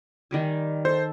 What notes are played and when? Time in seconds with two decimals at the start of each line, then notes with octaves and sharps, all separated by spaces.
0.31 D#3 G3 G#5
0.85 A4 C5